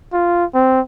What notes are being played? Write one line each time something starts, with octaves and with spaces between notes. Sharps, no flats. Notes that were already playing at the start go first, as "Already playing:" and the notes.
F4
C4